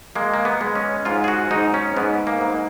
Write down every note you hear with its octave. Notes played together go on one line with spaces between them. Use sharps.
G#3 A#3
A#3
B3
G#3
C#4
G#2 F4
G#4
F#4
G#2 D#4
C#4
G#2 B3
A#3
G#2